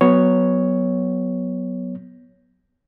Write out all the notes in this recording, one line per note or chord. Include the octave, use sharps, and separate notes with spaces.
F#3 B3 C#5